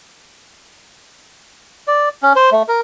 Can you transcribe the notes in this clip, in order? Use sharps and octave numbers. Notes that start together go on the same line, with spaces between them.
D5
C#4
C5
A3
A#4